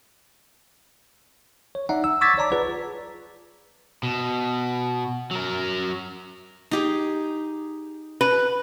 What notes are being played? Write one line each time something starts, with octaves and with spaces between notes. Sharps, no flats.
C#5
D#4 D5 E5 F#5 A#5
E6
C#6 D6 E6 G#6 A6 B6
C#5 D5 A5 A#5 D6
F4 G#4 B4 D5 F#5
B2
F#3 A#4
D#4 G4 G#4
B4